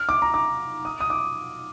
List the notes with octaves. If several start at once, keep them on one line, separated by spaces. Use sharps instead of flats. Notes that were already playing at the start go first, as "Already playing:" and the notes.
Already playing: F6
D6
A#5
D6
D#6
D#6
D6